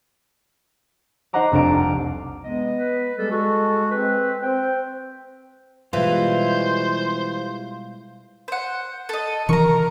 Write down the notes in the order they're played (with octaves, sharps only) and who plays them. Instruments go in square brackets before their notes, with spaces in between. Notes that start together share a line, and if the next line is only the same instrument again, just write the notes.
[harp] D#4 C5 D#5 F#5 A#5 D6
F1 C2 D4 A#4 D7
D6 F6
[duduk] G#3 [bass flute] B3 [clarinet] D#5
[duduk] B4
[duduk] G3 [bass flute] G#3 [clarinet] A4
[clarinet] F#4 [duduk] A4
[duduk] C4 [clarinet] B4
[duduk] C4 [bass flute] C5 [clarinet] G5
[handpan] B2 G3 G#3 [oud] E3 [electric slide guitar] F4 [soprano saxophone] C5
[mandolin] C5 F#5
A4 D#5
[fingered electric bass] C3 D#3 E3 [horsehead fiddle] A#4 [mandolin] A#5 C#6